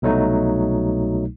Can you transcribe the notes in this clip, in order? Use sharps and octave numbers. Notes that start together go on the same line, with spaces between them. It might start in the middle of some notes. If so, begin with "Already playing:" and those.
C2 B2 F#3 A3 D#4